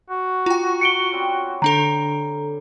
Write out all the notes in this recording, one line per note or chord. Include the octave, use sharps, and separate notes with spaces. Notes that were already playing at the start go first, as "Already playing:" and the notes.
F#4
F4 G5 A#5 D6
C#7 D7 G7
G3 C4 C#4
D3 D4 A4 A#5